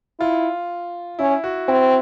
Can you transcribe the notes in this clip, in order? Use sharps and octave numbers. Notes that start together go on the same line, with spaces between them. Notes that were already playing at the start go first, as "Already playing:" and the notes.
E4 F4
C#4 E4
F#4
C4 E4